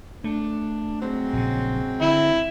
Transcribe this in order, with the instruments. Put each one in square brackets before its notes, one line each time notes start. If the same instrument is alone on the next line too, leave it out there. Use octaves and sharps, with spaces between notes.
[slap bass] A3 [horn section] D4
[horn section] F#3 G#3 C4
[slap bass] A#1 C#3
[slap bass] D3 [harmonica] E4